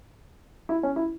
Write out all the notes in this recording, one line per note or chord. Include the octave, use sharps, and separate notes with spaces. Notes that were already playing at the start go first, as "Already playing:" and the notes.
E4
C#4
E4